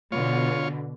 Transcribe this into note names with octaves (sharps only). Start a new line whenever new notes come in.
B2 D3 F4 C#5